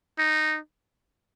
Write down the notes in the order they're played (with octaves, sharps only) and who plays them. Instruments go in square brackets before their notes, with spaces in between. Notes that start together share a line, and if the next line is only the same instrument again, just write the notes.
[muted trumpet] D#4